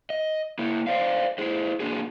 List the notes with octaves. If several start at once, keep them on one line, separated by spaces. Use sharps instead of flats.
D#5
A#3 E4
C5 D5 D#5 F5
E4 G#4 C5
A#3 D4 F#4 G#4